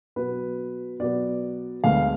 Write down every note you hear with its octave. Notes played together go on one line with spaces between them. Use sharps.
B2 F#3 B3 B4
B2 F#3 B3 D5
D2 D3 G#3 B3 F5